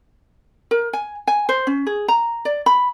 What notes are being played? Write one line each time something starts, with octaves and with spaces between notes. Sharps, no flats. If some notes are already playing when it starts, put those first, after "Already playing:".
A#4
G#5
G#5
C5
C#4
G#4
A#5
D5
B5